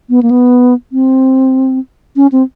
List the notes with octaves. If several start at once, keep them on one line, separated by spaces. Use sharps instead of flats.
B3
A#3
B3
C4
C#4
C4